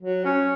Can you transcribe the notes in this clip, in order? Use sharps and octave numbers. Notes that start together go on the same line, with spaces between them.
F#3
C#4